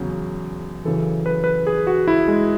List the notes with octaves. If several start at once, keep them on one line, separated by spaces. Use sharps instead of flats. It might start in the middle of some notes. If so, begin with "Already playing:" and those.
Already playing: E2 C#3 F#3
F#2 C#3 E3 A4
B4
B4
G#4
F#4
E4
G#3